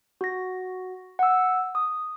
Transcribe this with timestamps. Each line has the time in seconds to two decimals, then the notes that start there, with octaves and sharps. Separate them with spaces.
0.21 F#4 A#6
1.19 F#5 E6
1.75 D#6